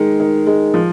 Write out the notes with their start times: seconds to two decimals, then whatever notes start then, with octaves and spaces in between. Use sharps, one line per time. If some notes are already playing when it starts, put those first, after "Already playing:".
Already playing: D#3 G#3
0.20 D#3
0.47 G#3
0.74 F3